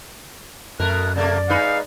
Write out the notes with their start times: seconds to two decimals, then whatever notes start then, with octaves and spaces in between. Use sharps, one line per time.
0.80 F#2 B2 A3 A#4 F#6
1.16 C3 A3 A#3 D5
1.49 G#3 D#4 B4 F5